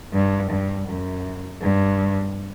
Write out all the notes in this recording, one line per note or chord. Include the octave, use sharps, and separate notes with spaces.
G2
G2
F#2
G2